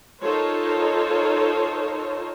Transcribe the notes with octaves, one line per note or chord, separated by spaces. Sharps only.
D#4 F4 A4 A#4 C5 C#5